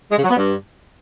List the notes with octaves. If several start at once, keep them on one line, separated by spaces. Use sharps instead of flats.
G#3
C#3
F#3
B3
G2